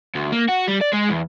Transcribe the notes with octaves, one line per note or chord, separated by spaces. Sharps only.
D2
A#3
F#4
G3
D5
G#3
E2